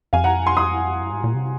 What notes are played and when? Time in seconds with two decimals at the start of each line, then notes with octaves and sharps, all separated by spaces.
0.13 F2 F5 G#5
0.24 F#5 A#5
0.46 G#5 C6
0.57 C6 D#6
1.02 F#2
1.12 G#2
1.24 A#2
1.35 C3